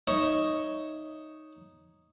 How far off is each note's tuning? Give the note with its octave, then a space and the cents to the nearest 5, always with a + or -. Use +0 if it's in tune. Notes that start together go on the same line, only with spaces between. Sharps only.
D#4 +0 C#5 +0 E5 +0